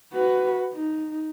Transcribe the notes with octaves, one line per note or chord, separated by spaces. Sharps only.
F#4 B4
D#4